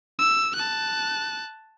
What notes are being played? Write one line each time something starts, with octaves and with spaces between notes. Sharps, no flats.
E6
A5 F#6